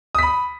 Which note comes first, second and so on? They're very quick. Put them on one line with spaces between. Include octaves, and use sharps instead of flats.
D#6 B6 B5